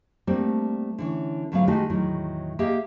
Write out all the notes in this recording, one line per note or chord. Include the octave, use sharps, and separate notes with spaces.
G3 A3 A#3 C4 D4
D3 E3 C#4
D2 G#2 F#3 B3 G#4 F5
D#3 G#3 A3 D#4 F#4 G4
E2 A2 D#3 F#3
A#3 G4 G#4 D#5 E5